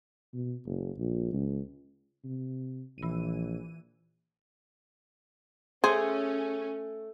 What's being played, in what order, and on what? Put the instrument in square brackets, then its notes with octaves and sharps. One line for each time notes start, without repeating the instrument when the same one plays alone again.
[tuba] B2
F#1
A#1
C#2
C3
[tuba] A#1 [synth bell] E3 D#7
[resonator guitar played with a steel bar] A3 [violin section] C#4 [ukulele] G#4 [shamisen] C5